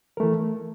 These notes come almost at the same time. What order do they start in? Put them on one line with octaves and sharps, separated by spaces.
A#4 A3 E3